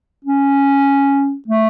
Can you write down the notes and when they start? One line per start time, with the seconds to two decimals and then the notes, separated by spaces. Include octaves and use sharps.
0.25 C#4
1.48 A3